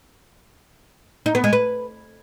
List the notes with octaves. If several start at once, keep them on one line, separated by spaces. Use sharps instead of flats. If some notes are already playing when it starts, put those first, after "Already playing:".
D#4
B3
G#3
B4